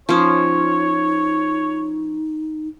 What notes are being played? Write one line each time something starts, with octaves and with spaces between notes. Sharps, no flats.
F3 C#4 D#4 C#5